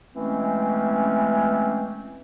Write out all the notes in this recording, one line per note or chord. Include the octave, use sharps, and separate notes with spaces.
E3 G#3 A3 C4 C#4